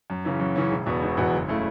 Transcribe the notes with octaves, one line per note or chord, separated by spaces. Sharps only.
F#2
C#3 E3 C#4
F#2
C#3 E3 C#4
E1
E2 B2 B3 F#4
E1
E2 B2 B3 F#4
F#1
C#3 A3 E4